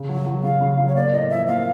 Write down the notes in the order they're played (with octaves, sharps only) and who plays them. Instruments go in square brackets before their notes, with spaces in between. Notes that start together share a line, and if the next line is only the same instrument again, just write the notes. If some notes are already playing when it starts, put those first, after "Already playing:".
Already playing: [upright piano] C#3
F#3
F#3
[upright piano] C#3 [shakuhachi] F5
[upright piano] C#3
F#3
[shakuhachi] C#5
[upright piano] A#3 [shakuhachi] D5
[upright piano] A2 [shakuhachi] D#5
[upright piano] F3 [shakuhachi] E5
[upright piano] A#3 [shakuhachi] F5